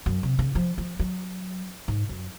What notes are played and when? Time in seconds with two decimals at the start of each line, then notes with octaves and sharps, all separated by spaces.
0.06 F#2
0.23 C3
0.39 C#3
0.55 F3
0.78 F3
0.99 F#3
1.88 G#2
2.09 F#2